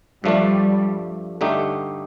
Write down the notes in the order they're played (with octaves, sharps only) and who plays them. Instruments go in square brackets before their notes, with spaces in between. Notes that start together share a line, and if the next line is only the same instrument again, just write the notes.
[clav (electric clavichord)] G2 F3 A3 D4 [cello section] G3
[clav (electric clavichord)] G2 D3 A3 D#4 G4